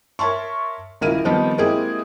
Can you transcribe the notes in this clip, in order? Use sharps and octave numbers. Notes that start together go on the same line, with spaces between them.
A#4 C#5 E5 A5 C6 C#6
D#1 C#2 E4 A#4 F5 D#7
D#3 F3 G3 B3 C4 D#4
G#3 A#3 C4 E4 G4 G#4